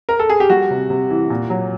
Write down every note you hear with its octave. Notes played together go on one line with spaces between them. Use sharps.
A#4
A4
G#4
G4
G3 F#4
C3
C3
E3
A#2
F#3